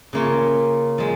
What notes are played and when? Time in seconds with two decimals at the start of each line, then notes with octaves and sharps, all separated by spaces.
0.13 C#3 A#3 F4 C#5
0.98 F3 G#3